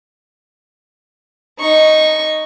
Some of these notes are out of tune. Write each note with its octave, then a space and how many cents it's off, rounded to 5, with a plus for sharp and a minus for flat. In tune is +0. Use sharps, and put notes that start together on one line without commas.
D#4 +0 C#6 +0